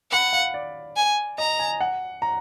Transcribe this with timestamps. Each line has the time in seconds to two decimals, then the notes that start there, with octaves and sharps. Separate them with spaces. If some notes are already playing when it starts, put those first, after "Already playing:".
0.12 F#5 B5
0.33 F5
0.54 D5
0.96 G#5
1.38 D#5 A#5
1.59 G#5
1.80 F#5
2.22 A#5